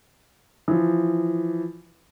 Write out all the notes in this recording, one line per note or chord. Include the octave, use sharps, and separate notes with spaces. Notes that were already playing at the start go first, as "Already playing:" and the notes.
E3 F3